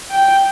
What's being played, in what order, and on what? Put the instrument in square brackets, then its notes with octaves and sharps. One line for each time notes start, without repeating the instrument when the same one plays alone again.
[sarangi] G5